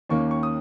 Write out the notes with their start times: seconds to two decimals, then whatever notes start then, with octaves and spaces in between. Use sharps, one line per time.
0.09 D#2 D#3 A#3 C#4 C#6
0.31 C#6
0.43 D#6